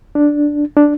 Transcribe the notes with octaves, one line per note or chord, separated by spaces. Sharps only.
D4
D4